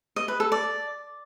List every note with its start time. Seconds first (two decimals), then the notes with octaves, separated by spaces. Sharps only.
0.16 D#5
0.28 B4
0.40 A4
0.52 D5